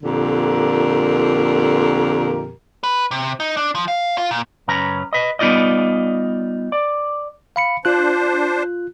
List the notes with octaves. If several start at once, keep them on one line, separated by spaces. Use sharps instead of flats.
F2 A#2 D3 G4 A#4
B4
C3
D#4
D4
F3
F5
F4
A#2
F#2 C#3 C#4 B4 A#5
B4 D#5
G3 B3 D#4 F4 D5 D#5
D5
F5 B5 C#7
D4 F4 C5 F#6